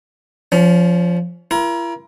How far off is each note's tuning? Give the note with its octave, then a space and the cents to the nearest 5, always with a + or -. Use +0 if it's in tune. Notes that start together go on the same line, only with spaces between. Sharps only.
F3 +0 C#4 +30
E4 +45 A#4 +30